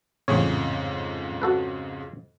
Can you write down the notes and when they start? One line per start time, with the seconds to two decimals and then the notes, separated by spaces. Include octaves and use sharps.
0.28 A1 F2 G#2 C#3 G#4 C#5
1.42 F#4 A4 B4